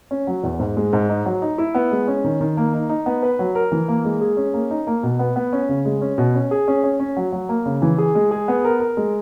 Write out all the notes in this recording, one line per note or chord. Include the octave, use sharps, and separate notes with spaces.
C#4
F#3
E2
G#2
G#3
G#2
D#4
F#3
D#4
E4
B3
G#3
C#4
D#3
D#3
A#3
D#4
D#4
B3
B4
F#3
A#4
E3
A#3
G#3
G#4
C#4
A#3
D#4
A#3
B2
B3
B3
C#4
C#3
G#3
C#4
B2
C#4
G#4
C#4
C#4
C#4
F#3
F#3
A#3
C#3
E3
G#4
G#3
G#4
B3
A#4
A#4
G#3